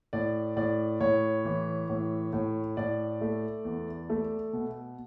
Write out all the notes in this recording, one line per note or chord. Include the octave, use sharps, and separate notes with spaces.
A2 D5
A2 D5
A2 C#5
E3
A2
A2
A2 D5
A3
E2
A3
B2